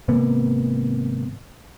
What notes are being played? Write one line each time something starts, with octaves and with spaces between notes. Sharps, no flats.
G#1 C3 A#3 B3